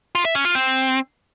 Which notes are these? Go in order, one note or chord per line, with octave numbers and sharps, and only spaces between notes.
F4
E5
C#4
F4
C4